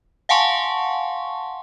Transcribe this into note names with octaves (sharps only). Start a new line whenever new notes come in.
F5 F#5 G#5 A5 C6 C#6